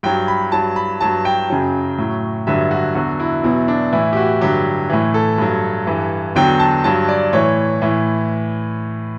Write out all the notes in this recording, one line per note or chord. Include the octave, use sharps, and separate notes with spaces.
G2 F#3 G5
B5
G2 F#3 A5
B5
G2 F#3 A5
G5
F#2 C#3 F#3
A2 F#3
G2 D3 F#3 E5
F#4
E2 D3 F#3 F#4
E4
E2 B2 F#3 E4
D4
A2 E3 E4
G4
F#4
G2 D3 F#3 G4
A2 E3
A4
G2 F#3
G2 E3
E2 D3 F#3 G5
A5
G2 F#3 A5
D5
A2 E3 C#5
A2 E3